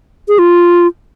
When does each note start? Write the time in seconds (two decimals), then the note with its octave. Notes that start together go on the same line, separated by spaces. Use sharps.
0.28 G#4
0.39 F4